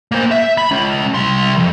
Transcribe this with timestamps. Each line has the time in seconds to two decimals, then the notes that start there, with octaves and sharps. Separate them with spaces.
0.12 A#3 C5
0.31 E5
0.58 B5
0.71 G#3 C#4
1.14 C2 C6
1.58 F2